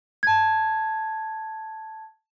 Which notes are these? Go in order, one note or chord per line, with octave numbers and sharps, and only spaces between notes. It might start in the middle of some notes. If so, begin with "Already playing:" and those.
A5 G#6